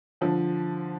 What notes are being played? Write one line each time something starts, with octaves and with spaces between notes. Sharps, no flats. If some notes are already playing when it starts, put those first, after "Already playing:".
D3 F3